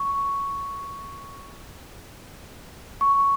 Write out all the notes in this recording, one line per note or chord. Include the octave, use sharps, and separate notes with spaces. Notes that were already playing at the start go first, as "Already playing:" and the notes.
Already playing: C#6
C#6